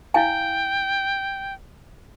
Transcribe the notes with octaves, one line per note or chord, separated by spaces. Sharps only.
E4 F5 G5 G#5